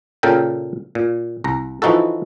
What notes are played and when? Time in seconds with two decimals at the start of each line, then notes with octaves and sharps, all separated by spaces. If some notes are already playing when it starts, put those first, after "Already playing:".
0.23 A#2 C#3 A4 A#4 G5
0.95 A#2
1.44 C2 A#5
1.82 E3 F3 D#4 F#4 A4